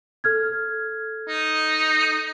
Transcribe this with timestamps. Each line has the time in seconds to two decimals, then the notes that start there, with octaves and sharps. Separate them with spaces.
0.24 A4 F6 G#6
1.29 D#4